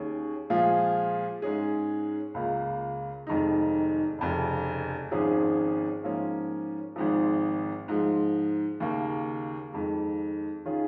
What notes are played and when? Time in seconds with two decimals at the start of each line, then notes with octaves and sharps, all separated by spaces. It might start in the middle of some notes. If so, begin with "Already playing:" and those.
Already playing: D#2 D#3 C#4 G#4
0.50 A#2 F3 G#3 F4 G#4
1.42 G#2 G#3 C#4 G#4
2.34 C#2 C#3 A#3 F4
3.27 F1 F2 D#3 G#3 D#4
4.19 F1 F2 C#3
5.11 G#1 G#2 F3 C#4 G#4
6.04 G#2 F3 A#3 C#4
6.96 G#1 G#2 F3
7.88 G#2 F3 G#3
8.80 D#2 C#3 A#3
9.73 F2 D#3 G#3
10.65 D#3 C#4 F4 G#4